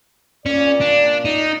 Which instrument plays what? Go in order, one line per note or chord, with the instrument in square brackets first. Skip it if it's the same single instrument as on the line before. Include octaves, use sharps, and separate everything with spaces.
[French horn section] A#2 D5 [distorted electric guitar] C#4
[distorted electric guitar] D4
D#4